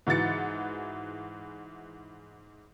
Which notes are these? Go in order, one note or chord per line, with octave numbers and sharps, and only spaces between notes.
G#2 E3 F#4 A6 C#7